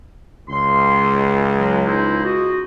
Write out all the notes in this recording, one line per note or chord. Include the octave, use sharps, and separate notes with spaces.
C#2 C6
F#3 G#3
D#4 E4 C5
F#4 D#5